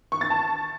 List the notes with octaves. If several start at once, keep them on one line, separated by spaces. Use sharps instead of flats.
C#6
A6
A5